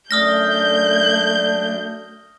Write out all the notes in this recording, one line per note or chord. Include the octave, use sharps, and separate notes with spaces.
F#2 A3 D4 D#6 F6 G6 A#6